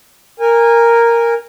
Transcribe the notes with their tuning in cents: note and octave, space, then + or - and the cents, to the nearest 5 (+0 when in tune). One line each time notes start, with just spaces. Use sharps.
A#4 +0 G#5 -25